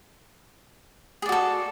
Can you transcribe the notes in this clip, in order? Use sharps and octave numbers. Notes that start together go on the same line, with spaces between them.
F#4 G#4 A4 D5